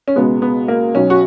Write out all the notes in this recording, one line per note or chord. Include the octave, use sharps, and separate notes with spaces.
C#4
C#2 B2 G#3 B3
B3
A#3
B1 B2 F#3 C#4
F#4